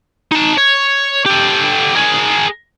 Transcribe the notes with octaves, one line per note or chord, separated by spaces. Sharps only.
D#4 A5
C#5
G4 A4
G#4 A#4